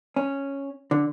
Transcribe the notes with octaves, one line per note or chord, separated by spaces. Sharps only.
C#4
D3